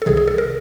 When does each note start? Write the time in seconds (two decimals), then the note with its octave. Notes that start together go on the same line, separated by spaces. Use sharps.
0.02 A4
0.06 C2 C3 D#3 G#4
0.17 G#4
0.28 A4
0.38 A#4